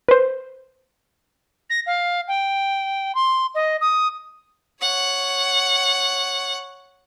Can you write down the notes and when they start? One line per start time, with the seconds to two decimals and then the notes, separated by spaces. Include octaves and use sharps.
0.08 B4 C5
1.70 A#6
1.86 F5
2.28 G5
3.15 C6
3.55 D#5
3.81 D#6
4.81 C#5 F#5